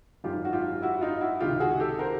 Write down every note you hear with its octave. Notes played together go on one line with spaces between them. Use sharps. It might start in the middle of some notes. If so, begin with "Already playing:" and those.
G#1 F#2 D#3 F4 G4
F#4
F4 G4
E4 F#4
D#4 F4
E4 F#4
C#2 C3 D#3 F4 G4
F#4 G#4
G4 A4
A#4 C5